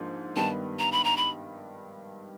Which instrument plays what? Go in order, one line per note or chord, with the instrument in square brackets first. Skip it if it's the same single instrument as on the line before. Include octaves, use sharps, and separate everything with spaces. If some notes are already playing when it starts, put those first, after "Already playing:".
Already playing: [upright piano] G#2 F3 A#3 D4
[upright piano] G2 D#3 G3 B3 [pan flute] A5
[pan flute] A#5
B5
A#5
B5